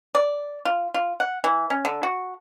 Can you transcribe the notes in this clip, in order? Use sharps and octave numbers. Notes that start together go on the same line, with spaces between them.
D5
F4
F4
F#5
E3
C#4
D3
F#4